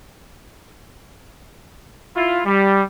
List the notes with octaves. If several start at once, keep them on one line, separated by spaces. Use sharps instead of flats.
E4 F4
G3